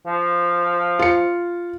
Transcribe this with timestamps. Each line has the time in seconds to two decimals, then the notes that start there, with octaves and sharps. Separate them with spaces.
0.06 F3
0.99 F4 C#7